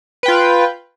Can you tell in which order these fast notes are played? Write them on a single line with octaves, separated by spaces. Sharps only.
B4 G5 F4